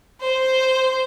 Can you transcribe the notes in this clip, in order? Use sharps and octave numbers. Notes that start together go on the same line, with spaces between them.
C5